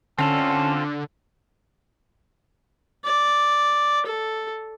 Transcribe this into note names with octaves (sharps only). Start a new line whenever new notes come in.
D3 C4 C#4 F4 A4 A5
D5
A4